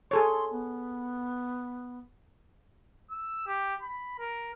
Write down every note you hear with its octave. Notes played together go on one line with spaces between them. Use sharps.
G#4 A4 C#5 C6
B3
E6
G4
B5
A#4